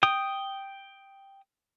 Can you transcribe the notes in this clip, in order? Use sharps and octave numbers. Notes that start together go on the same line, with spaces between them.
G5 D#6